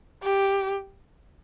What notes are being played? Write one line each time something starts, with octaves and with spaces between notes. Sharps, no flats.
G4